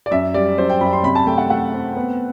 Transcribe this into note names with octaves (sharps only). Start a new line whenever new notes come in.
D5
F#2 E5
G3 D5
F#2 C5
G5
F#2 B5
C6
C3 B5
A5
A3 G5
F#5
A3 F#5
C4
B3